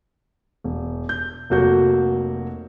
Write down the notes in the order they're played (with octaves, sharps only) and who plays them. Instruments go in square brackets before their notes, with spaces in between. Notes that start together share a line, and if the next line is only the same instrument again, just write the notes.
[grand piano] E1
G6
F1 F#3 A#3 F#4 A4 G6